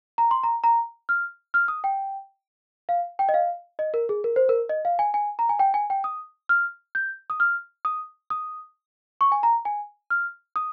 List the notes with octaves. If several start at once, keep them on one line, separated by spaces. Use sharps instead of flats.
A#5
C6
A#5
A#5
F6
F6
D#6
G5
F5
G5
D#5
F5
D#5
A#4
G#4
A#4
C5
A#4
D#5
F5
G#5
G#5
A#5
G#5
G5
G#5
G5
D#6
F6
G6
D#6
F6
D#6
D#6
C#6
G#5
A#5
G#5
F6
D#6